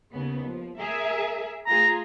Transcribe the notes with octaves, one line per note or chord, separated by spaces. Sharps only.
D#2 C#3 B3
F3
G#4 A#4 E5
A3 F4 G#4 A#5